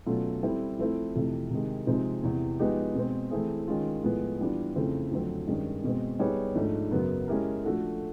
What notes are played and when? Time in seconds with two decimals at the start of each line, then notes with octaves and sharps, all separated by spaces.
0.06 B2 F#3 A3 C#4 F4
0.43 G3 C4 E4 A4
0.79 F3 A3 C4 E4
1.15 F2 C3 E3 A3
1.51 C3 D#3 G#3
1.87 C3 F3 G#3 C4 D#4
2.23 E2 C3 E3
2.59 F3 G#3 B3 D#4 G4
2.95 B2 G#3 C4
3.31 E3 A3 C4 E4 G#4
3.68 D#3 G#3 C#4 F4
4.04 A2 F3 G#3 B3
4.40 E3 G3 B3 D4 F4
4.76 F2 C#3 E3 A3 C4
5.11 F2 D3 F#3 A3 C4
5.47 G2 D#3 G#3 C#4
5.84 B2 G#3 C4
6.19 G3 B3 D#4 G#4 C#5
6.55 G#2 F3 A3 D4
6.91 F#2 C#3 F#3 B3
7.28 G#3 C#4 E4 G4 A#4
7.64 F3 A3 D4 F#4 A4